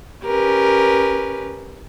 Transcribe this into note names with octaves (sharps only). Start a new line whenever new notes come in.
C#4 G4 A#4 B4